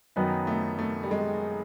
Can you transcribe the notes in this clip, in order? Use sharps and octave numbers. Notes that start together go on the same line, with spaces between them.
F#2 D#3 F#3 B3 D#4
A3
A3
G3
G#3